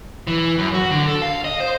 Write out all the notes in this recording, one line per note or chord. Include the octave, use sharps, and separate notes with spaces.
E3
F#2
F#4
D3
A4
F5
D#5
C5